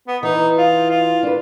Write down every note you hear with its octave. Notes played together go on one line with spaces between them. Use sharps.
B3
E3 D#4
F4
F4
D4 B4